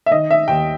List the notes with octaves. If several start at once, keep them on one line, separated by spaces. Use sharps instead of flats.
E5
D#3 D#5
E5
D#2 G5